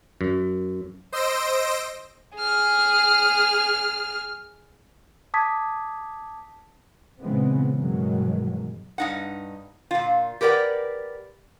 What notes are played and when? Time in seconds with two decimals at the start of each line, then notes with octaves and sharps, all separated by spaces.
0.21 F#2
1.12 C5 D#5 C6 E6 A#6 D7
2.37 G#4 F6
5.34 A5 D6 D#6 G#6 B6
7.21 A#2 C#3 E3 G#3 B3 C4
7.77 G2 B2 D#3 E3 F#3 G#3
8.98 G2 D#4 F#5
9.91 A#2 F4
10.41 G4 A#4 B4 D5 F#5